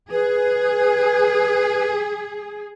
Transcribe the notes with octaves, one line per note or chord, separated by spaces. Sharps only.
G#4 B4